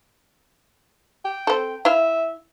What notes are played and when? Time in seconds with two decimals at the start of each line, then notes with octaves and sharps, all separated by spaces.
1.25 G5
1.47 C4 A4
1.85 E4 E5 F5